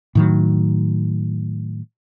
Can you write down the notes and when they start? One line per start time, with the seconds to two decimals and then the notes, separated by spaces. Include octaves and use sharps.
0.15 A2 D#3 F#3